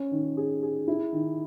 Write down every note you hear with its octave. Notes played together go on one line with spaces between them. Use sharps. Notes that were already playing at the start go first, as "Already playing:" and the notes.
Already playing: C#4
D#3
G#4
G#4
E4
D#3